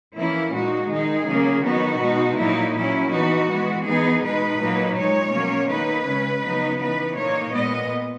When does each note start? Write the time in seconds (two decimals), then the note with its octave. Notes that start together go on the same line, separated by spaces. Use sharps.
0.16 E3 A#3 C#4 E4
0.53 A#2 G#3 D#4 F#4
0.90 D#3 G#3 D#4 G#4
1.27 C#3 F#3 A#3 C#4
1.64 D#3 F#3 B3 D#4 F#4
2.00 B2 G#3 D#4
2.38 A#2 F#3 A#3 D#4 E4
2.74 A#2 F#3 C#4 E4
3.11 E3 B3 D#4 F#4
3.48 E3 G#3 B3
3.85 E3 B3 D#4 G#4
4.22 B2 G#3 D#4 B4
4.59 A#2 F#3 A#3 D#4
4.95 A#2 G#3 D#4 C#5
5.32 B2 F#3 A#3 C#4
5.69 D#3 A#3 D#4 B4
6.06 C#3 G#3 C#4
6.43 C#3 F#3 B3 D#4
6.79 E3 B3 D#4 B4
7.16 A#2 A#3 D#4 C#5
7.53 A#2 G#3 B3 D#5